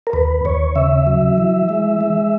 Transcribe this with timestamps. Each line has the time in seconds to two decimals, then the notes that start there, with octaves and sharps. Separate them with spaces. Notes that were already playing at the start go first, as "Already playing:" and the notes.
0.07 A#4
0.13 D#2 B4
0.45 D#2 C#5
0.76 C#3 E5
1.07 F#3
1.38 E3
1.69 G#3
2.01 G#3